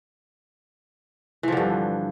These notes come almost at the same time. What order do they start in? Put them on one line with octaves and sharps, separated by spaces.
E3 F3 D3 G2